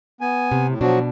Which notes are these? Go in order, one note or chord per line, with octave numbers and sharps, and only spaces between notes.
B3 G#5
C3
A2
B2 F3 F#3 D4 F#4